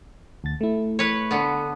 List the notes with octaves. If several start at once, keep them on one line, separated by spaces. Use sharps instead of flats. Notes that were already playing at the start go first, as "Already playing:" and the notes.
D2 A6
A3 E4
B4 C#5
D3 B3